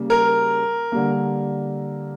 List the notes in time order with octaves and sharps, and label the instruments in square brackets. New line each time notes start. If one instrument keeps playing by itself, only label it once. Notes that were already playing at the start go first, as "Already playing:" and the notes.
Already playing: [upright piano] C#3 G3 A#3
[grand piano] A#4
[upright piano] D3 G3 A#3